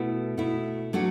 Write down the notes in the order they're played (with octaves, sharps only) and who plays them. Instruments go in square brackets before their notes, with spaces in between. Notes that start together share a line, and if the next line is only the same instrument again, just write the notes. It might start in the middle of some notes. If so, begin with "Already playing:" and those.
Already playing: [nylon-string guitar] B2 A3 E4
B2 A3 E4
F#3 A3 D4 F#4